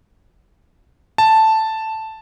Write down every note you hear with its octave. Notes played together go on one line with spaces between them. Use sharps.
A5